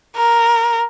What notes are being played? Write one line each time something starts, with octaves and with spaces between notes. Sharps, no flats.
A#4